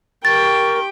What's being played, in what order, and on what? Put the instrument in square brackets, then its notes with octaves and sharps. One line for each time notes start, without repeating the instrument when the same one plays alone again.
[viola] G4 G5 [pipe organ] A#4 [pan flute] C#6 [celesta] A6